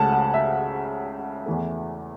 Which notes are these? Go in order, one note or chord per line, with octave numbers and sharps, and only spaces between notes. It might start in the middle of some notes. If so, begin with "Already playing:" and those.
Already playing: C#2 C#3 A3 F#5 A5
F#5
E5
E2 E3 A3